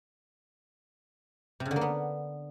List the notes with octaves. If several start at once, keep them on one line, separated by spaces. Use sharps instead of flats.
C3
C#3
D3
A#3
B3